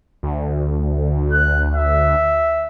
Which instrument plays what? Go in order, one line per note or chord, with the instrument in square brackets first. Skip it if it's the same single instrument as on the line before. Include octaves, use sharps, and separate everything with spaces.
[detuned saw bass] D2
[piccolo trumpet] F#6
E5